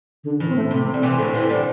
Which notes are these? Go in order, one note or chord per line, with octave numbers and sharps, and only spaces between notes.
D3
A2 E3
C4
A3
C3 C4
G3
C3 E3
A2 D3
C3 E3
D3 G3